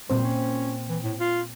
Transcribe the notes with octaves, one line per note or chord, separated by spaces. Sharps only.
A#2 G3 C4 C5
C#4
E3
A2
F4